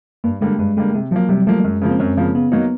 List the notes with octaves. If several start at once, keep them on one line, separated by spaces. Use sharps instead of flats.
G2 A#3
D3 G3 G#3 A#3
G2 G#3
D3 G3 G#3 A#3
C3 G#3
F3 F#3 A#3
C3 G3
F3 A3 A#3
F#2 G#3
C#3 F3 A#3
C4
F#2 C#4
C#3 F3 A#3
C#3 B3
F#3 A#3 D#4